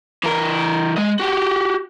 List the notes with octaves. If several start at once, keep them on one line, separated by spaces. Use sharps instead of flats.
E3 A#4
G#3 D#5
F#4 G4